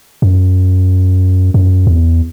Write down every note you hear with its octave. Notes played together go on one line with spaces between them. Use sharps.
F#2
F#2
E2